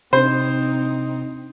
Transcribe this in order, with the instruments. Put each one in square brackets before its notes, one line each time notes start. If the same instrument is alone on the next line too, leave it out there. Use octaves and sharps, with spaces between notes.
[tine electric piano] C3 D4 [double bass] C4 D#4 [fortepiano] C5